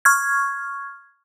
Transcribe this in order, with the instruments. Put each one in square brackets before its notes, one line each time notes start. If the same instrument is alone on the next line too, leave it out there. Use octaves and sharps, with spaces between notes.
[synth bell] C#6 F6 G#6